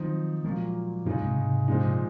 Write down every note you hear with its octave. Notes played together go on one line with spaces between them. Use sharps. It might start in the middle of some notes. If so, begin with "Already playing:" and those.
Already playing: D#3 F3 F#3 C4 D#4
A#2 F3 F#3 G#3 A#3
F#2 A#2 C#3 G#3 D#4
G#2 C3
G#2 C3
A#2 F3 G#3 D#4